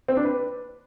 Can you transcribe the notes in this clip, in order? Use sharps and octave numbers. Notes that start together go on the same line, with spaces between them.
C4
D4
B4